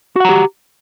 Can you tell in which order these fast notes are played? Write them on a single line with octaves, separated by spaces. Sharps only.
F#4 F#5 A#5 G4